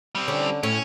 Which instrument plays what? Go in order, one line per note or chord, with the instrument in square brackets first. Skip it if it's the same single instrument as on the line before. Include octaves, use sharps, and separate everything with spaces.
[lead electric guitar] G3 C4
[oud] D3 C#4 D4
[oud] A2 [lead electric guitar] C#4